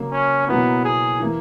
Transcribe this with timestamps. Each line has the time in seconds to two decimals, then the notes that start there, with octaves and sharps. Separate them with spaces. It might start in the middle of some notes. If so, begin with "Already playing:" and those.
Already playing: C#3 F#3 A#3
0.12 C#4
0.48 B2 F#3 A#3 B3 E4
0.85 G#4
1.20 E3 A#3 E4